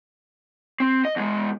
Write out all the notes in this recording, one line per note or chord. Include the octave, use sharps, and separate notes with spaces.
C4
D#5
E2 G#3